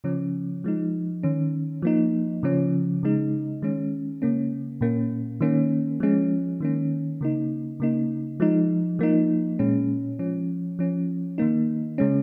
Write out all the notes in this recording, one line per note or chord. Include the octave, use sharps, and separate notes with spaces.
C#3 F3 C#4
F3 G#3 D#4
D#3 C#4
F3 A#3 D#4
C#3 F3 C#4
C#3 G#3 D#4
D#3 G#3 C#4
C#3 A#3 C#4
A#2 A#3 C#4
D#3 A#3 C#4
F3 G#3 C#4
D#3 A#3 C#4
C#3 A#3 D#4
C#3 A#3 D#4
F3 G#3 D#4
F3 A#3 D#4
A#2 G#3 C#4
F3 C#4
F3 C#4
D#3 A#3 D#4
C#3 G#3 C#4